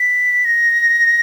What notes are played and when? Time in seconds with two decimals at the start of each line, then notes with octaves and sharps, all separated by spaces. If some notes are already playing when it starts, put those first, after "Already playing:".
Already playing: B6
0.45 A#6